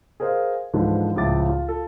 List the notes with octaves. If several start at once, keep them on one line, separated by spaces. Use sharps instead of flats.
G#4 A#4 C5 D#5 F5
G#2 D3 E3 F3 G#3
C#2 A2 F3 E4 D6 A6
F4
F4 A4